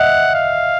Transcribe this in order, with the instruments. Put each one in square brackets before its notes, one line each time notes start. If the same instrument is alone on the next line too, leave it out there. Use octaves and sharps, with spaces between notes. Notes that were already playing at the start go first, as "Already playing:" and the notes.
Already playing: [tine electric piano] D#5 E5 [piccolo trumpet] F#5
[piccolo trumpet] F5